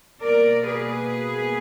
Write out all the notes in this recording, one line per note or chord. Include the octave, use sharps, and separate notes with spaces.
B2 A#3 A#4 D5
G#4 B4